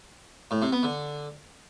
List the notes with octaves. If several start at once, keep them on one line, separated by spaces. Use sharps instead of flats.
A2
C3
B3
D3